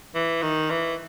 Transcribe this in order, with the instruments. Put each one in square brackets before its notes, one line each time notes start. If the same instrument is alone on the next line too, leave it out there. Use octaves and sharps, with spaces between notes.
[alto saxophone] E3
D#3
E3